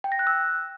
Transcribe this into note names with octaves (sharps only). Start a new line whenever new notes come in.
G5
A#6
F#6
E6